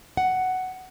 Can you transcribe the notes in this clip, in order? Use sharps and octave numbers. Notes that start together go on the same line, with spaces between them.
F#5